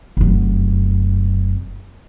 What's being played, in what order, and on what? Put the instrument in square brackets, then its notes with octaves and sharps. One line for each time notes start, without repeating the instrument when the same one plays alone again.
[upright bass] F1 F#2